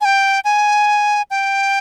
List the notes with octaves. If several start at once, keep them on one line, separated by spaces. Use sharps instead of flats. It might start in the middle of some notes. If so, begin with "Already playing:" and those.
G#5
G5
G#5
G5